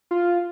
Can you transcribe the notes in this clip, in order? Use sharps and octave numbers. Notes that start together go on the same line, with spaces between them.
F4